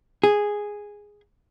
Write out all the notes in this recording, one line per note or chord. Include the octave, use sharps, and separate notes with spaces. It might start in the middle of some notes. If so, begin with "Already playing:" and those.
G#4